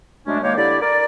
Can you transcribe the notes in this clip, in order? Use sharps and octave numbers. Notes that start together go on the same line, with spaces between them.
F#2 G#3 A3 C#4 D4
D#3 G#3 A#3 G4 C#5
D3 E4 G4 D5
A#4 D5